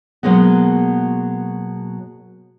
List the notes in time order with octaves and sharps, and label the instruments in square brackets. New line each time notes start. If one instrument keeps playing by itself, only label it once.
[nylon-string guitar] B2 F#3 G#3 A#3 B3